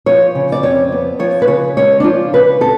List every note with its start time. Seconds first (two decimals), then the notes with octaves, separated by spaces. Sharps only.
0.06 F3 C#5
0.35 C#3
0.52 D5
0.63 F2 C#5
0.92 B3
1.19 F3 C#5
1.42 B4
1.48 C#3 C#5
1.77 G#3 C#5
2.00 D4
2.04 F3 F4
2.33 C#3 B4
2.60 B3 A4